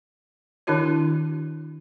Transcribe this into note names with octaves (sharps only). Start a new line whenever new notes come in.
D#3 D4 E4 F#4 C#5